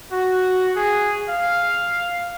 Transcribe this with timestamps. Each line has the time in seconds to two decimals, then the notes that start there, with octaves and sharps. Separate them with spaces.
0.12 F#4
0.76 G#4
1.29 F5